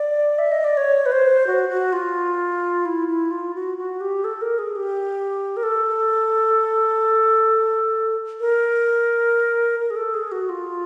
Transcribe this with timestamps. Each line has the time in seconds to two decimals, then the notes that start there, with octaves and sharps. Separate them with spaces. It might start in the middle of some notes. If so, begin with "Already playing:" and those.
Already playing: D5
0.38 E5
0.52 D#5
0.64 D5
0.77 C#5
1.06 B4
1.12 C5
1.47 F#4
1.69 F#4
1.93 F4
2.85 E4
3.08 E4
3.31 F4
3.55 F#4
3.78 F#4
4.00 G4
4.24 A4
4.41 A#4
4.58 G#4
4.76 G4
5.57 A#4
5.63 A4
8.40 A#4
9.80 A#4
9.90 G#4
9.96 A4
10.14 G#4
10.32 F#4
10.49 F4